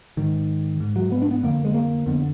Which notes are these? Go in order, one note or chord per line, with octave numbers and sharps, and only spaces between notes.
G#2 D#3
G#2
F#3
B3
D4
B3
F2 D3 A#3
G#3
A#3
F2 D3 B3